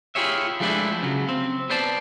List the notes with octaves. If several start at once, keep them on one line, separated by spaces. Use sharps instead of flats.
E4 F4 G4 G#4 C#5 E5
F3 G#3 A3 D4 E4 G4
C#3 F#3
C4
B3 C5 D5 A5